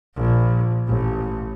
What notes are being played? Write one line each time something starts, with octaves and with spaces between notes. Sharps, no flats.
A#1
A1